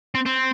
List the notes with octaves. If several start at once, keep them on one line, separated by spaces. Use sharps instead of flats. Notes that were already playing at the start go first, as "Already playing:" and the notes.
C4
C4